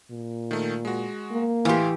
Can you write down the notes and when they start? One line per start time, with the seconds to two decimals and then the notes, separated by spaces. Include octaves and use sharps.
0.10 A#2
0.51 D#3 A3
0.85 G#3 F#4
1.31 A#3
1.65 A2 E3 G4 F5 C6